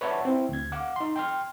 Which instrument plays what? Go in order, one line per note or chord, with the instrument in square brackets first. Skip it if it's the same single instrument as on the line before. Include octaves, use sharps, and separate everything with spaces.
[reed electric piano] B4 C#5 D5 E5 F#5 A5
C4 E4
D2 G#6
F5 F#5 D6
D#4 C6
G5 C6 F6